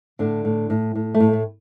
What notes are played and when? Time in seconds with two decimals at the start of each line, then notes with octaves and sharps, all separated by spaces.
0.19 A2 D3 D4
0.45 A2
0.70 A2
0.95 A2
1.14 A3
1.20 A2
1.33 A3